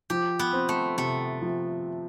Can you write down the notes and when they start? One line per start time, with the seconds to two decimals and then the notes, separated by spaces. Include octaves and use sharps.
0.10 F3 G4
0.39 B3
0.53 C4
0.69 A3
0.98 C3 A3
1.42 F3